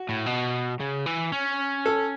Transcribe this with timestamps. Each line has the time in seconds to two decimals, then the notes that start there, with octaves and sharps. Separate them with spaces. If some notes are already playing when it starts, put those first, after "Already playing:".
Already playing: F#4
0.09 A2
0.26 B2
0.80 C#3
1.06 E3
1.32 C#4
1.86 A4